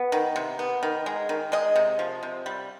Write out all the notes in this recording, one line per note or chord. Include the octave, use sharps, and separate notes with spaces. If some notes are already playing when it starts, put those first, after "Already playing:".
Already playing: B3
D#3
C3
B3
D#3
G#3
D#3
G#3 D#5
C3
F3
C3
G3